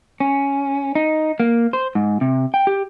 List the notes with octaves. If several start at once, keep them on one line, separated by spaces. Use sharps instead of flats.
C#4
D#4
A#3
C5
G#2
C3
G5
G4